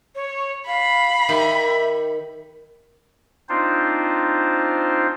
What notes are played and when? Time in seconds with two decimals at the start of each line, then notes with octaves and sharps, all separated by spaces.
0.15 C#5
0.67 F5 B5
1.28 D#3 G4 E5
3.49 C4 D4 D#4 F4 C5